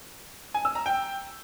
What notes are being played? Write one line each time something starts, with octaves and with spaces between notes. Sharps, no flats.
G#5
E6
A#5
G5